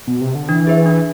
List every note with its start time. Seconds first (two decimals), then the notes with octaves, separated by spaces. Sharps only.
0.07 B2
0.21 C3
0.35 D3
0.49 E3 D4
0.67 G#4 B4 E5
0.86 D4